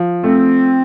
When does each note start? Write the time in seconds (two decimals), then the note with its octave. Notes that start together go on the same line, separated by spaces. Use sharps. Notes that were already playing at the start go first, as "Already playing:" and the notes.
Already playing: F3
0.24 A3 C4